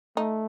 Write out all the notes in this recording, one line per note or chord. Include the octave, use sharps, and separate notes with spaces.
A3 D#4